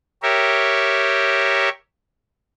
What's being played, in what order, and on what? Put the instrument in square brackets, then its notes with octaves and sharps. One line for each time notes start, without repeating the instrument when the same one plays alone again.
[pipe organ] G4 A#4 C#5 E5